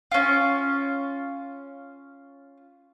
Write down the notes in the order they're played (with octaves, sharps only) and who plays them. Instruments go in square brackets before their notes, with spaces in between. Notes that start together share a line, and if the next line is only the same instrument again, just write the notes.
[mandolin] C#4 F4